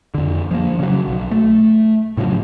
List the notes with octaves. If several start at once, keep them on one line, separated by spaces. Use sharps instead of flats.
F2 D3
F3 G#3 A#3
C#3 F#3
B1
A3
A2 C#3 F3 F#3